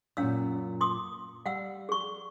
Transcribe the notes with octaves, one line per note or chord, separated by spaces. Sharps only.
F#2 A#2 C#4 F5 E6
C6 D6 D#6
G3 F5 F#5 E6
G#4 C#6